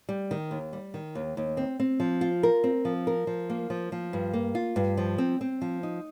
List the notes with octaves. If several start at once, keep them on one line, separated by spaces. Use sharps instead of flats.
G3
D#3
D#2
G3
D#3
D#2
D#2
C4
C4
F3
F4
A#4
C4
F3
A#4
F3
A#3
F3
F3
G2
A#3
F4
G2
F3
C4
C4
F3
D#4